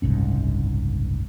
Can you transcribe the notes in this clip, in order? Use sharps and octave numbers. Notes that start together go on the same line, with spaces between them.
F#1 C2 G#2 C#4